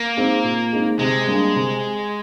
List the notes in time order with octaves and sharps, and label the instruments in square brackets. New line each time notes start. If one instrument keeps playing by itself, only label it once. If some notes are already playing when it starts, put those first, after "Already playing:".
Already playing: [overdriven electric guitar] A#3
[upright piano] G#3 C4 D#4
A#2
G#3 C4 D#4
[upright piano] C3 [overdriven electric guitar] G#3
[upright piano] G3 A#3 D4
C3